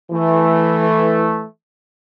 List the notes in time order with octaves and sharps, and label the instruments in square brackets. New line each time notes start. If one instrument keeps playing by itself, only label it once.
[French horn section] E3 [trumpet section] A3